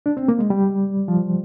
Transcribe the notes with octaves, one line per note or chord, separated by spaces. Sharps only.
D4
C4
A#3
G#3
G3
F3